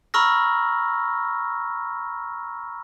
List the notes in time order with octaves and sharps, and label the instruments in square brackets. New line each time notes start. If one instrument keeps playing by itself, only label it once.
[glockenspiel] A#5 B5 C#6 E6 F6 A#6